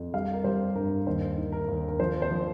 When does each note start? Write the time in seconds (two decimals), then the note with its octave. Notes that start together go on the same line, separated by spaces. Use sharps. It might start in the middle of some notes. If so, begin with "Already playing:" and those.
Already playing: F2
0.14 G3 F5
0.34 A#4
0.44 G3 C5
0.75 G2 A#4
1.06 D#2 C5
1.37 D#3
1.52 A#4
1.68 D#2
1.88 A#4
1.99 F3 C5
2.22 C5
2.31 F3